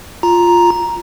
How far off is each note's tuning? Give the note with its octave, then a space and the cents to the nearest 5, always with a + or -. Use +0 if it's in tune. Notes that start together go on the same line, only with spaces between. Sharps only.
F4 +0 A#5 +5